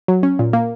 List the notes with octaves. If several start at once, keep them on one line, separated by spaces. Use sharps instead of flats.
F#3
C#4
A#2
A#3